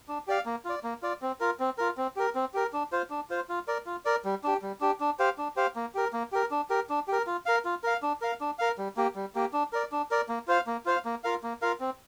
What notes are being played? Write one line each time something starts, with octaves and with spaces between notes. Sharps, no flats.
D4
G4 D5 F5
A#3
F4 D5
A#3
F4 D5
C4
F4 A#4
C4
F4 A#4
C4
G4 A#4
C4
G4 A#4
D4
F4 C5
D4
F4 C5
F4
A#4 D5
F4
A#4 D5
G3
D4 G4
G3
D4 G4
D4
G4 C5 F5
D4
G4 C5 F5
A#3
G4 A#4
A#3
G4 A#4
D4
G4 A#4
D4
G4 A#4
F4
A#4 F5
F4
A#4 F5
D4
A#4 F5
D4
A#4 F5
G3
A#3 G4
G3
A#3 G4
D4
A#4 D5
D4
A#4 D5
A#3
F4 C5 F5
A#3
F4 C5 F5
A#3
F4 A#4 F5
A#3
F4 A#4 F5
C4